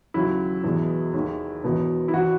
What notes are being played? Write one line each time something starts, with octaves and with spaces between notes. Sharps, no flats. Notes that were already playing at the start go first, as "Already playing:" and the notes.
D#2 C#3 F#3 E4
E2 B2 G#3
D#2 D#3 G#3
E1 E2 B2
E4
G#1 E3 F#4